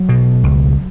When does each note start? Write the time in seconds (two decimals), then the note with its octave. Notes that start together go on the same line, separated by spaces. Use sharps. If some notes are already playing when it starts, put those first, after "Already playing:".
Already playing: F#3
0.09 B2
0.44 C#2